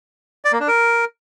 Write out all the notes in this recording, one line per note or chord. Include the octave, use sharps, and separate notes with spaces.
D5
A#3
D4
A#4